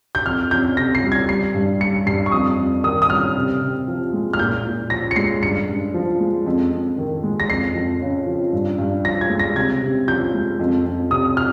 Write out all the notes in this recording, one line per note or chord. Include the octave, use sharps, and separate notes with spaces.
G6
F2 F6
F2 G6
C3 A#6
C7
G3
G#6
G3 C7
G2
G3 C#7
G2 C7
C#6
F2 D#6
F2
D#3 D#6
D#6
G3 F6
C3
C3
F3
G#3
F6
A#2 G6
A#2
F3 A#6
C#7
G#3 C7
G2 C#7
G2
F3
G#3
F2
F2
D#3
G#3
A#6
F2 C7
F2
C#3
F3
G2
G2
F3 A#6
G#6
G#3
A#6
C3 G#6
C3
F3 G6
G#3
F2
F2
C3 D#6
F6